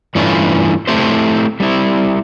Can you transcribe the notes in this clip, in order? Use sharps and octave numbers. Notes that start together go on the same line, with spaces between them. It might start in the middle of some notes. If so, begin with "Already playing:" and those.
G2 E3 A3 C#4 F4
A3 C4 E4 G4 C5
G3 C4 E4